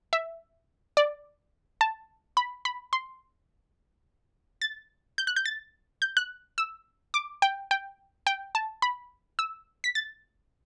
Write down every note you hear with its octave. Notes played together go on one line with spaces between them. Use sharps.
E5
D5
A5
B5
B5
C6
A6
G6
F#6
G6
A6
G6
F#6
E6
D6
G5
G5
G5
A5
B5
E6
B6
A6